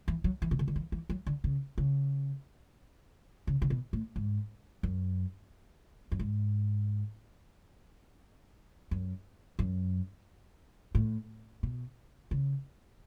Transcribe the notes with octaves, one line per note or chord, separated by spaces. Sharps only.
E3
F#3
E3
B2
C#3
D3
E3
E3
F#3
D3
C#3
C#3
C#3
C#3
B2
A2
G#2
F#2
F#2
G#2
F#2
F#2
A2
B2
C#3